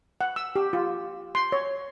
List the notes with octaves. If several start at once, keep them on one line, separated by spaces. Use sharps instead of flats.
F#5
E6
G4
F4
C6
C#5